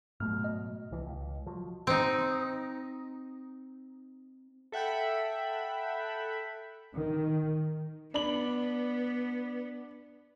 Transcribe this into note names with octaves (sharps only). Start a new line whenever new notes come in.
G#2 B2 F#3 A3 F6
D#5
C2 E3
C#2
F3 F#3
C4 D#4
A4 E5 F#5 G5 B5
D#3
B3 D4 B5 F#7